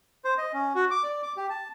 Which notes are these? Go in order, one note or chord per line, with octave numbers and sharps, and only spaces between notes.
C5
D#5
C#4
F#4
D6
D5
D6
G4
A5